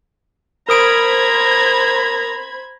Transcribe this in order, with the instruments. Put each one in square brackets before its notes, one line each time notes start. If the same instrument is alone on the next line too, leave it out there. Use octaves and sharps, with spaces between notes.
[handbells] A#4 D#6 D7 [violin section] C5 B5 G#6 [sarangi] A#5